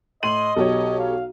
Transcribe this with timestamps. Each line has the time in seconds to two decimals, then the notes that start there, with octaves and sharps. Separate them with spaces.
0.23 A2 D#5 C6 D#7 F#7
0.56 B1 G4 A4 C#5
0.99 F5